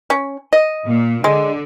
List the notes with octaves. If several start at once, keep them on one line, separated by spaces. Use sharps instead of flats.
C#4
D#5
A#2
D3 G#3